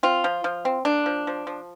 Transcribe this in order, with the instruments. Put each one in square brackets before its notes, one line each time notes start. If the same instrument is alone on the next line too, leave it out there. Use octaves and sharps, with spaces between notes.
[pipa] C4 F4
F3
F3
C4
A#3 D4
F3
F3
F3